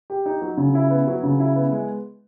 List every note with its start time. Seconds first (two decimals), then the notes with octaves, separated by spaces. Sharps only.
0.10 G4
0.26 D#4
0.41 F#3
0.57 C#3
0.75 E4
0.90 B3
1.07 F#3
1.23 C#3
1.39 E4
1.56 B3
1.72 G#3